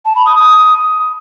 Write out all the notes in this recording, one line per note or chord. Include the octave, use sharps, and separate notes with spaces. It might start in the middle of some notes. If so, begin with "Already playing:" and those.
A5
B5
D#6
D#6